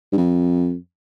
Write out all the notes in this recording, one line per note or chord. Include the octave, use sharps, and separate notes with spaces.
G2
F2